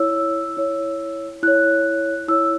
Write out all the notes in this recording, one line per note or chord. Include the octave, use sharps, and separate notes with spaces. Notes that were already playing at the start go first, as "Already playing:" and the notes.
Already playing: E4 C#5 E6
E4 C#5
E4 C#5 F#6
E4 C#5 E6